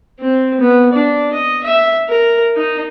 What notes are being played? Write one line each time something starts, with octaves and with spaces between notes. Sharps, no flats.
C4
B3
D4
D#5
E5
A#4
D#4